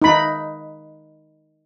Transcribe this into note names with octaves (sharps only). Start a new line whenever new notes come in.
D#4 B5